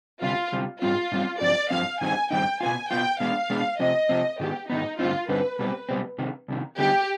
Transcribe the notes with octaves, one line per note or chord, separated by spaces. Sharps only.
D2 C3 G3 F4
D2 C3 G3
G#2 G3 C4 F4
G#2 G3 C4
G2 F3 C4 D5
G2 F3 C4 F5
G2 D#3 G3 C4 D#4 G#5
G2 D#3 G3 C4 D#4 G5
B2 B3 F4 G#5
B2 B3 F4 G5
B2 G#3 B3 D4 F5
B2 G#3 B3 D4
C3 F3 C4 D#5
C3 F3 C4
G#2 D#3 B3 G4
G#2 D#3 B3 D#4
G2 D3 G3 C4 D#4 F4
G2 D3 G3 C4 D#4 B4
B1 B2 G3 C4 B4
B1 B2 G3 C4
C2 C3 D#3
C2 C3 D#3
D2 D3 G3 B3 D#4 G4